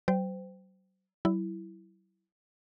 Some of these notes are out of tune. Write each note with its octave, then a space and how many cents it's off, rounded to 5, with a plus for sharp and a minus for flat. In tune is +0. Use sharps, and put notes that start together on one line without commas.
F#3 +40 C5 -30 G5 +0
F#3 +40 E4 +0